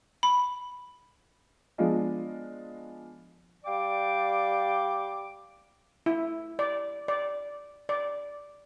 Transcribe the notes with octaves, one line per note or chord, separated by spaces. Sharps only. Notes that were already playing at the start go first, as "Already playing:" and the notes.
B5
F3 G#3 B3 D4 F4 D#5
G3 D5 F5 G5 D6
E4
D5
D5
D5